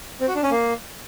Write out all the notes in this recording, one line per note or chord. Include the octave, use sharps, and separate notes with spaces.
C4
F#4
D4
C#4
A#3